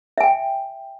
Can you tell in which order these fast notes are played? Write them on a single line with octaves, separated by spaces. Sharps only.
E5 G#5 G5